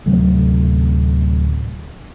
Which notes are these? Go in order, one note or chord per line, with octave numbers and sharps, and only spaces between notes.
D1 C3 F#3 A3